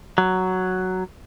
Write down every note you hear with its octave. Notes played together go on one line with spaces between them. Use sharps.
F#3